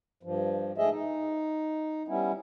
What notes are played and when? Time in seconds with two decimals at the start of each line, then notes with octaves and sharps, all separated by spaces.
0.23 G2 F3
0.78 G#2 A3 G#4 D#5 E5
0.91 D#4
2.08 G3 B3 C#4 E4